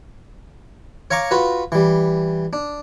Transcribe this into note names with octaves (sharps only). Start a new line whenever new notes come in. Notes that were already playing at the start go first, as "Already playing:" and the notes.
C#5 F5 A#5 C#6 D6
F4 F#4 B4
E3 G3
D4